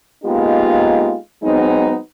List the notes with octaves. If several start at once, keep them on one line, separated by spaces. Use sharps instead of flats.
G#3 A#3 B3 D#4 F4 G4
F#3 G#3 B3 C4 D#4